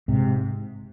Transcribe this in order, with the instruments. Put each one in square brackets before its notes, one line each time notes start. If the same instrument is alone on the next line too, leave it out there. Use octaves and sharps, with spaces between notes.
[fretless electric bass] G#2 C3